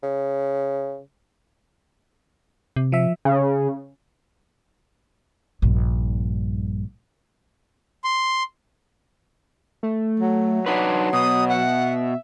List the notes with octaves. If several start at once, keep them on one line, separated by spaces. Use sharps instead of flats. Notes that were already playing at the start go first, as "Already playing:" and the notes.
C#3
C3
F3 E5
C#3
A#1 G2
C6
A3
F#3
F#3 D4 D#4 B4 C6
B2 D#6
E5 F#5